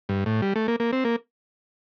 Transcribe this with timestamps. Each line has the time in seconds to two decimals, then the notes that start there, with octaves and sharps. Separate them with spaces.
0.09 G2
0.26 A2
0.42 G3
0.56 A3
0.68 A#3
0.80 A#3
0.93 C4
1.05 A#3